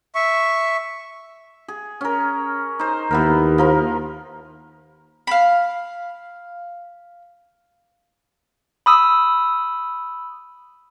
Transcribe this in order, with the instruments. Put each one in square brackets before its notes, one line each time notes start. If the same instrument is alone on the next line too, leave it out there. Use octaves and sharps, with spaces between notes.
[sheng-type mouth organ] E5 C#6
[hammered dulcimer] G#4
C#4 A#4
D#4 C5
[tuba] D#2 [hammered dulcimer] E3 B3 A#4
[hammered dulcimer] F3 A#4 F5
[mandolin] F5 B5
[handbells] B5 D#6 E6